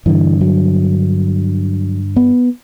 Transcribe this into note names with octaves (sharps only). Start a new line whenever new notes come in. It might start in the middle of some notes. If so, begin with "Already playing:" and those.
G2 D3 E3
F#3
B3